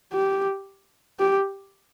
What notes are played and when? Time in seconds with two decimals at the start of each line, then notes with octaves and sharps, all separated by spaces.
0.13 G4
1.19 G4